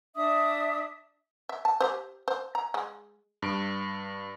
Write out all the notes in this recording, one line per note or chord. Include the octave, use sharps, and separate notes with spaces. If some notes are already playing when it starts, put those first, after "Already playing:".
D4 E5 D#6
E5
A5
G4 C5
C5
A#5
G#3
G2 D7